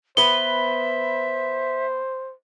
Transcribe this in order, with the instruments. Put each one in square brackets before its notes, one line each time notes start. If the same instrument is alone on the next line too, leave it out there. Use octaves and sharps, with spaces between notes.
[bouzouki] B3 B4 [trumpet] C5 [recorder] E5 [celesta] G7